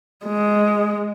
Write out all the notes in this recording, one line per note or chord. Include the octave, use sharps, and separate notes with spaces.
G#3